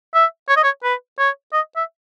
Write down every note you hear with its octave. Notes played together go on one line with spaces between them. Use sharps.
E5
C#5
D#5
C#5
B4
C#5
D#5
E5